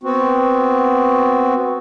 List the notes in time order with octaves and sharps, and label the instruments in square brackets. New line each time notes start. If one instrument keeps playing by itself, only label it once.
[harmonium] B3 C4 F#4